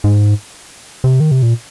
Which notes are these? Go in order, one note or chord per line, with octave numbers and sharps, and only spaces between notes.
G#2
C3
D#3
C3
A#2